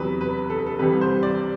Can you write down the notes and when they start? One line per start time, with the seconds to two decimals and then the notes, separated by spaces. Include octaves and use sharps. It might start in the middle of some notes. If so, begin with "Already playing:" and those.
Already playing: E2 C3 F#3 B4
0.21 B4
0.50 A4
0.58 B4
0.66 A4
0.79 C2 C3 E3 G3 B4
1.01 C5
1.23 D5